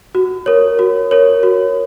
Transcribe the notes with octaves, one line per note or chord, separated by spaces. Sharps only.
F#4
A#4 C#5
F#4
A#4 C#5
F#4